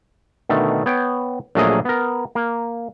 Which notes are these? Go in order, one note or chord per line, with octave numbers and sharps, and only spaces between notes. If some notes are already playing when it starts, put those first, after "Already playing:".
B2 D3 D#3 A3
B3 C#5 G5
A#1 F#3 A3 A#3 G#4 D#5
B3 A#4
A#3